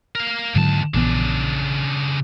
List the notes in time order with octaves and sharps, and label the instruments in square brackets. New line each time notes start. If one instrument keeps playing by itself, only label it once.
[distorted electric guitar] A#4 F5
[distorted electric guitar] D#2 A5 [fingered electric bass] G#2 D3 F#3
[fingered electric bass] A#1 E3 B3 [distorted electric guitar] C#3 D4